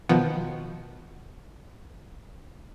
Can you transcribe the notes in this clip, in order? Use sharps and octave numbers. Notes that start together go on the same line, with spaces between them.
B2 D#3 F3 B3